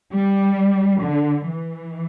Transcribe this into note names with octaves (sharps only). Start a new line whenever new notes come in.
G3
D3
E3